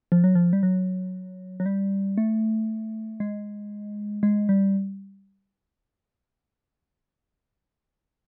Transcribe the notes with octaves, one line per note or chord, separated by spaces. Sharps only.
F3
F#3
F3
G3
F#3
F#3
G3
A3
G#3
G#3
G3